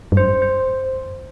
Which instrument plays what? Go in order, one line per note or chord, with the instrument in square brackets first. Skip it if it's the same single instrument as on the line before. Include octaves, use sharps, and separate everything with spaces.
[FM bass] G2
[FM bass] F#2 [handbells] C5
[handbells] C5